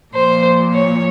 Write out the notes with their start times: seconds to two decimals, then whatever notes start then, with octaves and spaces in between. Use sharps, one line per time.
0.14 A#2 F3 C5
0.72 C#5